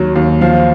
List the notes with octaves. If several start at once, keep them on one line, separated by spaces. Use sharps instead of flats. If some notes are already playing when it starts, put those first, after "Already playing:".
Already playing: D#2 F#3
D#2
F3 F5